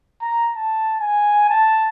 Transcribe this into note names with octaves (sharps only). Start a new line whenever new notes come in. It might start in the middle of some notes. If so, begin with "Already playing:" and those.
A#5
A5
G#5
A5